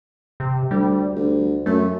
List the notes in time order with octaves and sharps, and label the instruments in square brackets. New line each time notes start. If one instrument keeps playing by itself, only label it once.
[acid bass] C3
[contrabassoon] D2 [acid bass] G3
[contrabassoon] D2
[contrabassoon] F#2 [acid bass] A3